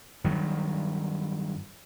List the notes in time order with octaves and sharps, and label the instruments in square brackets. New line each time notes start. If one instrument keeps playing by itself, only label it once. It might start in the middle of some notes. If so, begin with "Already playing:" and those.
[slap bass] G2 D#3 F#3